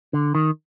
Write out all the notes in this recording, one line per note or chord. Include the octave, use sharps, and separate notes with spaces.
D3
D#3